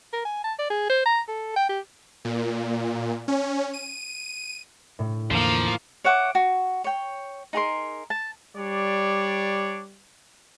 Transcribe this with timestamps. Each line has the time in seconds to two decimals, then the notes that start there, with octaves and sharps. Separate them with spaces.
0.13 A#4
0.25 G#5
0.44 A5
0.59 D5
0.70 G#4
0.90 C5
1.06 A#5
1.28 A4
1.56 G5
1.69 G4
2.25 A#2
3.28 C#4
3.73 D#7
4.99 A2
5.31 E2 D3 F3 A#3 F5
6.04 C#5 E5 F#5 D6
6.35 F#4
6.84 C#5 G5
7.53 D#4 G#4 A#4 C6
8.10 A5
8.56 G3 D4 C#5 D5